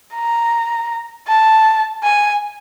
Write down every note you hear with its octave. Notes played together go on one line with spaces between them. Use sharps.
A#5
A5
G#5